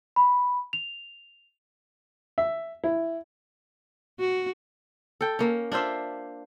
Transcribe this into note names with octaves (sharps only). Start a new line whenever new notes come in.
B5
F7
E5
E4
F#4
A4 G5
A#3 C#4
D4 F4 C5 E5